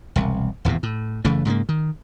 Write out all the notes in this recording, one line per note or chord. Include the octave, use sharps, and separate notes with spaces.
E1 C2
D#1 E2 A2 C3
A2
F#1 C#3 E3 A3
G#2 C#3 F#3 A#3
D#3